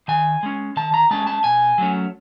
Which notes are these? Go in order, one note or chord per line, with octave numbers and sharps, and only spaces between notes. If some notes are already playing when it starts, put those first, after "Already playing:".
D#3 G#5
G#3 C#4
D#3 A5
A#5
G#3 C#4 A5
A5
B2 G#5
F#3 A3 C#4